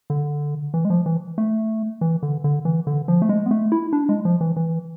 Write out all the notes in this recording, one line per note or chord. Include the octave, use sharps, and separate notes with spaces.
D3
E3
G#3
F3
E3
A3
E3
D3
D3
E3
D3
F3
A3
G#3
B3
A3
E4
D4
G#3
F3
E3
E3